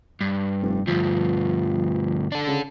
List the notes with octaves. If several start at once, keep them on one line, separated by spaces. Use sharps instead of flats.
G2
F1
D2 G2 F3
D4 A4
C#3